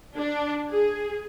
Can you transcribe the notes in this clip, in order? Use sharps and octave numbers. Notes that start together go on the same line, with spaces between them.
D4
G#4